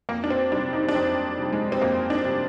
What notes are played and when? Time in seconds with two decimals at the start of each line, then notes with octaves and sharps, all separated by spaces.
0.09 F2 A#3
0.24 D4
0.30 C4
0.52 C3 G3 D4
0.73 D#4
0.88 D4
0.94 F2 C4
1.38 C3 G3
1.53 G#3
1.72 C4
1.81 F2 A#3
2.10 D4
2.25 C3 G3